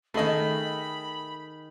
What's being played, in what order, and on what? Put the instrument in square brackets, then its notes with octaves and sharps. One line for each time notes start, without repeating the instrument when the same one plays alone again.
[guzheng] D#3 G#4 [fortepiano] A3 D#5 [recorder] B5